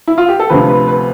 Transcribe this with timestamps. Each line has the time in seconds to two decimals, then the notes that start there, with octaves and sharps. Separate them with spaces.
0.07 E4
0.18 F4
0.29 G4
0.40 A4
0.50 D2 C3 F3 B4
0.69 B4
0.88 B4